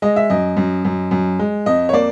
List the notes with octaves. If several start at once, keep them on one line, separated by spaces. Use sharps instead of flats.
G#3 D#5
E5
F#2 D#5
F#2
F#2
F#2
G#3
F2 D#5
C#5
A#3 D5